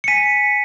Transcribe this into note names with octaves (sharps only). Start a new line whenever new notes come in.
C#7
G#5 B6 D#7